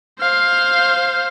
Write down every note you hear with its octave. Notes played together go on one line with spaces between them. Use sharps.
C5 F5